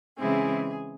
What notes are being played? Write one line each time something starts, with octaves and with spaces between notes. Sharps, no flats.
C#3 E3 G#3 C4 E4 G#4